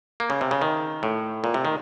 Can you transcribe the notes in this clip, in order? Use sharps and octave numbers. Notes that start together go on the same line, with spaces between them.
A#3
C#3
C3
C#3
D#3
A2
A#2
C3
D#3